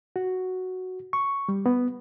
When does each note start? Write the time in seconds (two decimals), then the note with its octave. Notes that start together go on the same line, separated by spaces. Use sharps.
0.16 F#4
1.13 C#6
1.49 G3
1.66 B3